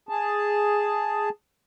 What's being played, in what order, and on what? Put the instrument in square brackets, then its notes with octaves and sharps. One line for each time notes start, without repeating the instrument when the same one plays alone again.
[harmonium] G#4 A5